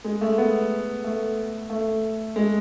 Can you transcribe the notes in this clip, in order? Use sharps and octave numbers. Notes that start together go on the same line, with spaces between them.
G#3
A3
B3
A3
A3
G#3